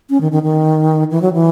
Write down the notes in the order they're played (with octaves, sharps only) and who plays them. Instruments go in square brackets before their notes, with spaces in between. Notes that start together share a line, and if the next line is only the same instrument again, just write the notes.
[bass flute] C#4
D#3
D#3
D#3
E3
F#3
E3